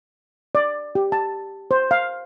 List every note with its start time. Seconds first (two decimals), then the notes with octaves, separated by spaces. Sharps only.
0.55 D5
0.95 G4
1.12 A5
1.71 C5
1.91 F5